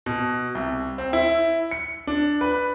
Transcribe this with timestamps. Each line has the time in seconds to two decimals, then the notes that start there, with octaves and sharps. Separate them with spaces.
0.06 B2
0.55 C2
0.98 C4
1.13 E4
1.71 C#7
2.07 D4
2.41 B4